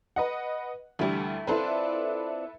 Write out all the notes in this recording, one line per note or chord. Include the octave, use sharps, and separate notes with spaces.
B4 D#5 F#5
D2 E3 G3 A3 E4
C4 D4 E4 F4 A4 B4